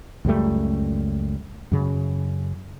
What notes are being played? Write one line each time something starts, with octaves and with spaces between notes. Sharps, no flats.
C#2 F#2 G3 A3
F#2 C#3